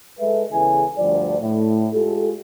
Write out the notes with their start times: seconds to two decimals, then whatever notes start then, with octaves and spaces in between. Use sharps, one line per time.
0.19 G#3 A4 B4 E5
0.51 E2 C#3 E3 A4 G#5
0.98 D2 G2 F3 D5
1.41 A2
1.93 G#3 F4 G4 A4